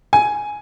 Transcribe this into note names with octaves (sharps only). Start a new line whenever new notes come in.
G#5